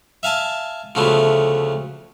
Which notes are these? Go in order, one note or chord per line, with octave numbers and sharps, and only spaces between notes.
E5 F5 G#5 A5
D2 C#3 F3 A3 B3